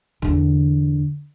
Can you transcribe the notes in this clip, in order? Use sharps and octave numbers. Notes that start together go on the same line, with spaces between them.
E2 D3